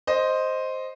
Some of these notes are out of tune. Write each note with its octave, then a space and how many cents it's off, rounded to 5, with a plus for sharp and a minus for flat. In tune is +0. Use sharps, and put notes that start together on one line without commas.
C5 +0 D#5 +0